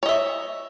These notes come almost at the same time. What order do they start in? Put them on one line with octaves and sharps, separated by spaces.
C#5 D#5 E5